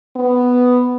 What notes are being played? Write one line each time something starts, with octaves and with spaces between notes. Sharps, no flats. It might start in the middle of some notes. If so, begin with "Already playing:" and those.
B3